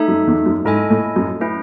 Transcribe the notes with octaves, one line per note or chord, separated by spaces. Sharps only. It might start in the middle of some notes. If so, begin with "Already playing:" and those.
Already playing: A3 D#4 A4 E5
F#2
E2
F#2
G#2 E4 A4 D#5 G#5
A2
F#2
A3 C#4 E4 B4